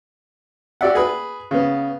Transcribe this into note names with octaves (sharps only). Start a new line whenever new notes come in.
F#4 G4 D5 E5 F#5
G#4 B4
C#3 B3